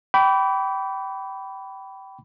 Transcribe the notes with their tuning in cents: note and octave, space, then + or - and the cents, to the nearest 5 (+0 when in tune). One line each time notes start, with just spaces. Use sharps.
G5 -20 B5 +5 D6 -40